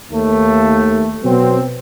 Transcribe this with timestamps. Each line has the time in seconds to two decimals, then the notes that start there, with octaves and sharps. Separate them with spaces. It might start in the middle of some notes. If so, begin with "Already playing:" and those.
0.11 D#2 A3
1.23 B2 F#3 B3 C4